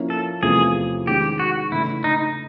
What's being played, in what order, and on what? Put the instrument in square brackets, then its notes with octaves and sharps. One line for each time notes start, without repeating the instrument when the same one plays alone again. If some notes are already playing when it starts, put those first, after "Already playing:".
Already playing: [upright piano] F3 A#3 C#4 E4
[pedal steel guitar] A4
[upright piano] E2 C3 F3 A3 C#4 [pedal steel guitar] G#4
[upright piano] D#3 G#3 C#4 [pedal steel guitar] G4
[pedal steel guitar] F#4
[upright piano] C#3 E3 A3 D4 [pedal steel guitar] E4
[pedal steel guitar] D#4